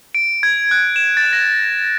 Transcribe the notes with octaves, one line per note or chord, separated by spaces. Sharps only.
D7
G#6
F#6
E7
A6
A#6